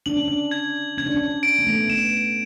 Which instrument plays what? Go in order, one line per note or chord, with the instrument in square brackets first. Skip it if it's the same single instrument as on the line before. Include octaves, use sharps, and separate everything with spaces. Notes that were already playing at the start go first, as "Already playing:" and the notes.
[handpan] D4 [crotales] F#7
[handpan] C#4
D4
[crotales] G#6
[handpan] C#4 [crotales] G#6
[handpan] D4
C#4
C#4
[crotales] D7
[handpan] B3
A3
B3
[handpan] B3 [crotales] E7